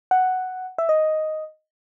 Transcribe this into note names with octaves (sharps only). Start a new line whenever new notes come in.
F#5
E5
D#5